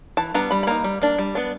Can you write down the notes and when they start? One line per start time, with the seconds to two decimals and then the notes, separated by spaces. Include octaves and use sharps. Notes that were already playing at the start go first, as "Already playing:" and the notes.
0.17 E3 A5
0.34 G3 B3 D4 A#5
0.51 G3 B5
0.63 B5
0.67 A#3 D#4 A#5
0.84 G3
1.02 A#3 D4
1.18 G3
1.35 B3 D4